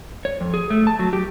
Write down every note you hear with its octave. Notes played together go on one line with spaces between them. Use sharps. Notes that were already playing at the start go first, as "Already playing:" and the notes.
C#5
F2
G#4
A3
A5
F#3
G4